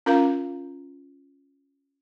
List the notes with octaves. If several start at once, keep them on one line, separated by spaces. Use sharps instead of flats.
C#4 F4 A#4 F5 A#5